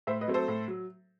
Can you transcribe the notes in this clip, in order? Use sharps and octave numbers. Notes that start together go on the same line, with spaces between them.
A2 C5 E5
B4 D#5
F#3 A3 C4
A4 C5
A2
F#3